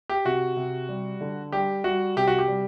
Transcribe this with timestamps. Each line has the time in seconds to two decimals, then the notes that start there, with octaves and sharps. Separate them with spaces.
0.09 G4
0.25 C3 F#4
0.56 C3
0.89 G3
1.21 D3
1.52 G3 G4
1.84 G3 F#4
2.16 C3 G4
2.28 F#4
2.39 G4
2.48 G3